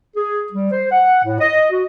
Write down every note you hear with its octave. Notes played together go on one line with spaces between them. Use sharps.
G#4
G3
C5
F#5
A2
D#5
F#4